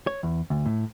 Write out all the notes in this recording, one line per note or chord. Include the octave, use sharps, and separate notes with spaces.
C#5
E2
D2
A2